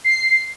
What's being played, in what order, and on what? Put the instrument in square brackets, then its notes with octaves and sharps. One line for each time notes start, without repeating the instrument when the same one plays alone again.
[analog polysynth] C7